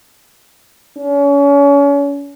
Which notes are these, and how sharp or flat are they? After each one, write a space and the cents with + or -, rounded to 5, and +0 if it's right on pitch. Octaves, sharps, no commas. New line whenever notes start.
C#4 +35